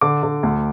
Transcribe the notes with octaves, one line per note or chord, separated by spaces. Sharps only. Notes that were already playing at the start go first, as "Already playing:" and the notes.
D3 D6
D3
D2